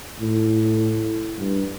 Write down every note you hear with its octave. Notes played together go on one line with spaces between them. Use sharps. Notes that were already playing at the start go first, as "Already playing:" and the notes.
A2
G2